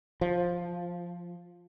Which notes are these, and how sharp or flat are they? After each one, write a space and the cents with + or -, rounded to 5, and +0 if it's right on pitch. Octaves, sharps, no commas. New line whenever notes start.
F3 +5